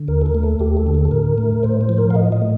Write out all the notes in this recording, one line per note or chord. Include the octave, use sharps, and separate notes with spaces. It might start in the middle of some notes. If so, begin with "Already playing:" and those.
Already playing: D3
D#2 A#4
A4
A#4
A3
A4
D#2 G4
A4
D3
A4
A4
A2 A#4
A3
A2 C5
C5
F3
A#4
F5
A2 D#5
D#5
A3